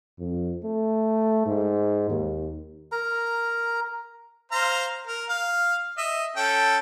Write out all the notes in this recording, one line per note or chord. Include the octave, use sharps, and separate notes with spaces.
F2
A3
G#2
D#2
A#4 A#5
C5 F5 A#5
A#4
F5
D#5 E5
C#4 A4 G5